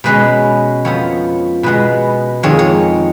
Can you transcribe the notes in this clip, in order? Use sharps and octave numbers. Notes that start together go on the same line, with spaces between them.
B2 G#3 C#4 B4
F2 F3 B3 C#5
B2 G#3 B3 B4
F2 D#3 G#3 C#5
C#5